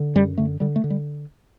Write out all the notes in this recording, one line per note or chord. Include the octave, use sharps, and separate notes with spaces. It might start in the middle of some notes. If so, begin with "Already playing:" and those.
Already playing: D3
F#2 G3
D3 A3
D3 G3
A3
D3
G3